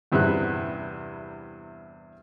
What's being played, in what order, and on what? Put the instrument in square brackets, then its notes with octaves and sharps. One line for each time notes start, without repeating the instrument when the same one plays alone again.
[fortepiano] E2 G2 C3 E4 E5 F#6